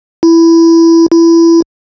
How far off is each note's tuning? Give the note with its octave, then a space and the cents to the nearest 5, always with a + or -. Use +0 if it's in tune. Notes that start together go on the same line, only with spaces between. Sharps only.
E4 +10
E4 +20